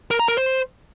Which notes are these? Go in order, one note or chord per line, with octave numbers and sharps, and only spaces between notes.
A#4
A#5
A#4
C5